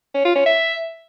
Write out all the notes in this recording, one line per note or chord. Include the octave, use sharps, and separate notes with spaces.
C#4
F4
C#4
E5